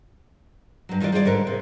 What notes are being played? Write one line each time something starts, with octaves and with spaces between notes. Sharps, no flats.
G2 F#3
D#3 E3 G3 F4 D5
G3 F4 G#4 C5 D5
G#2 D3 A#4 B4
C3